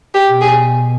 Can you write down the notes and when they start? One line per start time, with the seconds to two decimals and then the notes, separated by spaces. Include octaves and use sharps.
0.14 G4
0.27 B2
0.41 G#4